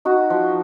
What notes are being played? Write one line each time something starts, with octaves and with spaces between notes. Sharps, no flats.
D#4 F#4
F3